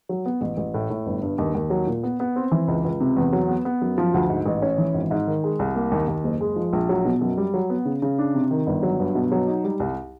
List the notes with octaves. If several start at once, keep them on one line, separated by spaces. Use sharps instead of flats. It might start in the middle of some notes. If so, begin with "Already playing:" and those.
F#3
B3
A1
A1
A2
A2
G1
G2
D#2
D#2
F#3
A#2
B3
B3
C4
E3
C#2
C#2
C3
E2
F#3
B3
B3
F#2
F3
D2
G#2
A1
C#4
E3
G#1
G#2
D#3
G#3
C2
A#3
D#2
D#2
F#1
G#3
F3
A#1
F#3
B2
F#2
G3
F#3
B3
C#3
C#3
D4
C3
D#3
G1
F#3
G2
B2
F#3
D#4
G3
C2